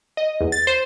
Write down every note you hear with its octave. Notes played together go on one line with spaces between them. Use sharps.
D#5
E2
A6
C5